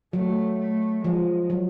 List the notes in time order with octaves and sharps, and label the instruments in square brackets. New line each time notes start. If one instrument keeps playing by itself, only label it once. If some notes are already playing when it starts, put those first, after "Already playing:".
[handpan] F#3 [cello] A3
[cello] A3
[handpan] F3 [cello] G#3
[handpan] F#3